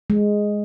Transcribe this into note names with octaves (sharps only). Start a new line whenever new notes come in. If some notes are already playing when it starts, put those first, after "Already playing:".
G#3